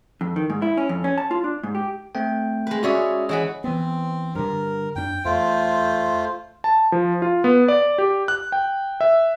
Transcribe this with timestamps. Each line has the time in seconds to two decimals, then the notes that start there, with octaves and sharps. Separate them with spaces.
0.21 F2
0.36 D#3
0.50 G#2
0.62 E4
0.77 C#4
0.89 F2
1.04 C#4
1.18 A5
1.31 F4
1.44 D4
1.63 G#2
1.75 G4
2.15 A3 C4 G5
2.67 G#3 B4
2.83 C#4 F#4 G#4 C#5 D5 E5
3.29 E3 G#4 C#5 D#5 F#5 B5
3.64 E3 B3 C4
4.35 G2 D3 A#4
4.96 F#2 C#4 D4 G5
5.25 E2 A3 F4 C5
6.64 A5
6.92 F3
7.22 F4
7.44 B3
7.68 D5
7.98 G4
8.28 F#6
8.52 G5
9.01 E5